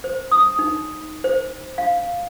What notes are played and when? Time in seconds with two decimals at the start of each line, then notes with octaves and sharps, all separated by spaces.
0.04 C5
0.31 D#6
0.59 D#4
1.24 C5
1.78 F5